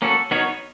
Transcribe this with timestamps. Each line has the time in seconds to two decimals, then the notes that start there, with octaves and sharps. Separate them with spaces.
0.02 A#3 C#4 F#4 A4
0.31 B3 D#4 F#4 A#4 C#5